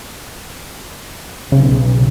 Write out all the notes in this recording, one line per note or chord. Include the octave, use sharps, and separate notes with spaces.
B1 C#3